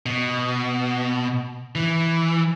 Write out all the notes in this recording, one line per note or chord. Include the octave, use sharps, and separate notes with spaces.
B2
E3